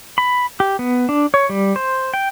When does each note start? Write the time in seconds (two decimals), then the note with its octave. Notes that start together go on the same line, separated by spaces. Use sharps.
0.18 B5
0.60 G4
0.79 B3
1.09 D4
1.34 C#5
1.49 G3
1.76 C5
2.14 G5